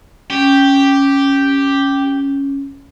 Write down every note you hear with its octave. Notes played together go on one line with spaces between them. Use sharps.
C#4 G4